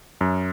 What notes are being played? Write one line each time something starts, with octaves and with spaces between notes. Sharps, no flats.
F#2